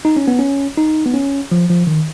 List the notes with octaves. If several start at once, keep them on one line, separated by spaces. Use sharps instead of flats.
D#4
C#4
B3
C#4
D#4
B3
C#4
F3
F3
D#3